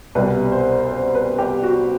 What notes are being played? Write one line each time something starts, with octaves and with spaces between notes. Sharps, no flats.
C2 B2 G3 B4
C5
C5
B4
G4
F#4